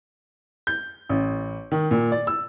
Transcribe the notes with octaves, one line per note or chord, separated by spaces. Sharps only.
G6
A1
D#3
A#2
D5
E6